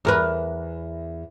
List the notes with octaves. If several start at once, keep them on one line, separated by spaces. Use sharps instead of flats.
E2 A#4 B4